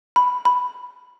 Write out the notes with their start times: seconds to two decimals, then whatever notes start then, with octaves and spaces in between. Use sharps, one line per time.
0.16 B5
0.45 B5